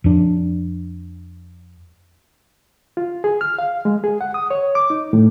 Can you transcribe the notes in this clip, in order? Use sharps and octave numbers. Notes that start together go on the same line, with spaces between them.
F2 D4
F4
G#4
F6
F5
G#3
G#4
F#5
D#6
C#5
D6
D#4
A2